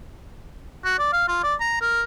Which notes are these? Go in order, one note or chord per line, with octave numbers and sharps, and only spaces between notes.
F#4
D5
F5
F4
D5
A#5
A#4